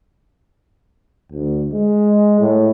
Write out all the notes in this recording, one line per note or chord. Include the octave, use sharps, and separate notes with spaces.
D2
G#3
A2